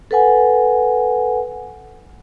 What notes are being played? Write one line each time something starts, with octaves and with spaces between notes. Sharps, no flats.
A4 B4 F#5 G#5